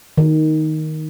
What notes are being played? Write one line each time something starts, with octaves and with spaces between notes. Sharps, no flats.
D#3